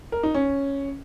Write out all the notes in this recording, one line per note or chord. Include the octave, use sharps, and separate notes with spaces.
A#4
D#4
C#4